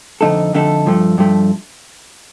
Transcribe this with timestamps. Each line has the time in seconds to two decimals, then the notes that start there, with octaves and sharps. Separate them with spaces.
0.21 F2 D3 A3 D#4 A4
0.53 F2 D3 A3 D#4 A4
0.86 G2 F3 A3
1.18 G2 F3 A3